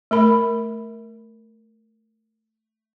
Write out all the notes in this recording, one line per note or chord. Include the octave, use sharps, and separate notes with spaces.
A3 A#4 B5